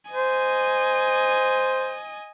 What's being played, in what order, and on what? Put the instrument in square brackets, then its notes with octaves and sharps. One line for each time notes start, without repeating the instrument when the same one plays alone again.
[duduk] C5 [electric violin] D#5 G#5